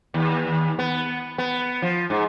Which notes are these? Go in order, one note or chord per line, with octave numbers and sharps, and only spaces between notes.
D#2
B3
B3
F3
G#2